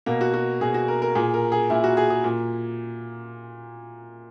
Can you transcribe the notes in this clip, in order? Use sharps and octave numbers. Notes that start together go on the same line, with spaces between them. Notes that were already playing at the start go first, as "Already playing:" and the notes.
B2 A#3
F#4
F#4
B2 G#4
F#4
A#4
A#4
A#2 G#4
A#4
G#4
A#2 E4
F#4
G#4
G#4
A#2